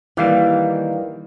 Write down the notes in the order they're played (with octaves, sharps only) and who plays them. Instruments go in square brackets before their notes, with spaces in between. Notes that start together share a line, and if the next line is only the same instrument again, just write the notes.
[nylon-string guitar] D#3 A#3 F5 [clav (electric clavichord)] E3 G3